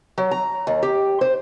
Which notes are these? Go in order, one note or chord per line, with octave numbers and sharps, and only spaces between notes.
F#3
A#5
D#2
G4
C5